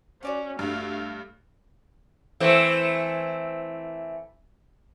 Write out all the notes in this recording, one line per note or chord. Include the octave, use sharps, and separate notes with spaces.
C#4 F#4 D5 F#5
G2 A3 F5
E3 A3 C4